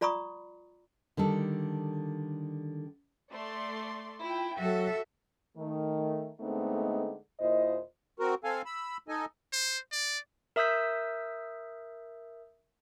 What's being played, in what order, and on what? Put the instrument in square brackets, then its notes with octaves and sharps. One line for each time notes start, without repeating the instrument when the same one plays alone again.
[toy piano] F4 D5 A#5 B5 C#6 D#6
[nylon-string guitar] D3 D#3 G3 A4
[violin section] A3 D5 C6
[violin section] E4 G5 [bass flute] F4
[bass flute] F#3 [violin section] F#4 [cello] A4 E5
[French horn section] D#3 A3
D3 G#3 A3 B3 C4 D#4
D#2 A#2 E4 C5 D#5
[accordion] C4 F#4 A#4
C4 A4 F5 G#5
B5 E6
D#4 A4 D#5 G#5
[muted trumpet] C5
D5
[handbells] A#4 E5 D#6 E6 G6 B6